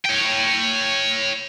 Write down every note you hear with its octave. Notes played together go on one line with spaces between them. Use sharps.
C#5 G5